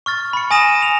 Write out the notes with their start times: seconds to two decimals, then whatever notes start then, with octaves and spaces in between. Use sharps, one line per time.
0.06 C#6 F6 A6
0.33 B5 C#7
0.51 G#5 D#6 A#6 D#7 E7
0.82 F7